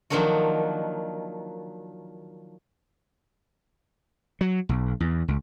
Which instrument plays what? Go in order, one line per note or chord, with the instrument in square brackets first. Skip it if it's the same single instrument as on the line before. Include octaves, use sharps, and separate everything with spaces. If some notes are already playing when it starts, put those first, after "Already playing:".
[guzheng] D#3 F3 F#3 A#3 D4 F#4
[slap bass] F#3
B1
E2
C#2